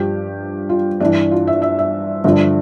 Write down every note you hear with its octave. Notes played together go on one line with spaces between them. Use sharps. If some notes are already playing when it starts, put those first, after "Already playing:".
Already playing: G2 F3 G4
F4
G2 E3 D4
F4
E5
E5
E5
G2 D3 F3